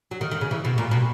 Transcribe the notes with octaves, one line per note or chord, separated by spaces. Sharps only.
F#3
D#3
D#3
C#3
E3
B2
A#2
B2